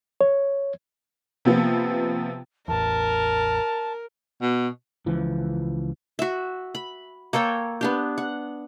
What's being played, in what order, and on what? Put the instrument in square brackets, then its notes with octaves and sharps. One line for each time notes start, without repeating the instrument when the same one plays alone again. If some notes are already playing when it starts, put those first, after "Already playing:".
[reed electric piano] C#5
[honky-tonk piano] C3 F3 B3 [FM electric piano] A#3 F4
[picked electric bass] A1 E2 [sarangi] A#4 [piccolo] A5
[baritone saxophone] B2
[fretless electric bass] C#2 E3 F3
[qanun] F#4 E5
B5
A#3 A4 C#5 G5
B3 D4 G4
F#5